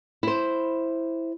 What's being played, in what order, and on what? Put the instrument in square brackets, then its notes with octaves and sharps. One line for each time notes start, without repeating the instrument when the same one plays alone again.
[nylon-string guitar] E4 C5